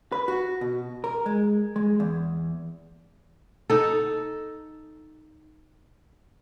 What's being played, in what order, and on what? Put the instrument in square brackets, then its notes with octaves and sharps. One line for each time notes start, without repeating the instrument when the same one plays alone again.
[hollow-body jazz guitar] B4
F#4
B2
A#4
G#3
G#3
E2
[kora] D#4 A4